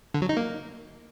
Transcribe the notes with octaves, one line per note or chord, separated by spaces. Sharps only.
D3
F#3
D#4
A#3